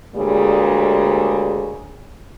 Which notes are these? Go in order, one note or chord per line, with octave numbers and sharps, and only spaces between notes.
D2 G3 G#3 A#3 G#4 C#5